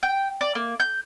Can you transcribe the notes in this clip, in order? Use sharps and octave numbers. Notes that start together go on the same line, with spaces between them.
G5
D5
A#3
G6